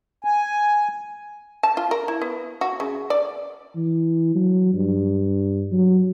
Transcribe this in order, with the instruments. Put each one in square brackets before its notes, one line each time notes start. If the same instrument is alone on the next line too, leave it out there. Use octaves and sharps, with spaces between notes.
[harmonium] G#5
[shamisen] A5
F4
A#4
E4
B3
F#4
C#3
D5
[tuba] E3
F#3
G2
F#3